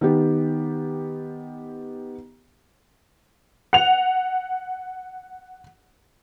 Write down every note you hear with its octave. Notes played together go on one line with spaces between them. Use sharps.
D#3 B3 G4
F#5 F7